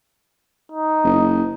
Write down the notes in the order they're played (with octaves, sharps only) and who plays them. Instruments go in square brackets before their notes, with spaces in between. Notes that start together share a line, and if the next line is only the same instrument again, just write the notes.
[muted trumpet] D#4
[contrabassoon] F#1